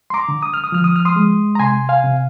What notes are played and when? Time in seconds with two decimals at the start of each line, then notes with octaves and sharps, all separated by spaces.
0.10 C6
0.14 A#5 D6
0.28 D3
0.43 D#6
0.54 F6
0.64 D#6
0.72 F3 F6
0.84 D#6
0.96 F6
1.05 C6 D#6
1.16 G#3
1.55 A#5
1.59 C3 G#5 C6
1.89 F5 G#5
2.04 C3